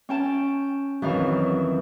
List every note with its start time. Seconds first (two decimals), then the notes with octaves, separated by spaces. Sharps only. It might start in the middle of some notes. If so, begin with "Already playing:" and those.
0.09 C#4 G5 A5
1.02 F2 D#3 E3 F#3 F5